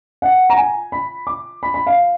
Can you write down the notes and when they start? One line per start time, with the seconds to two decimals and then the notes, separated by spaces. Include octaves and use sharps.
0.22 F#5
0.50 A#5
0.57 G#5
0.92 B5
1.27 D6
1.63 B5
1.74 B5
1.87 F5